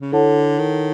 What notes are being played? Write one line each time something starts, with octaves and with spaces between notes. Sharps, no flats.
C#3
D3 E4 A4 C#5 F#5 A5
D#3